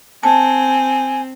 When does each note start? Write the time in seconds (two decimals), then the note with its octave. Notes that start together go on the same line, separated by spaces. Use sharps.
0.23 C4 G#5 A5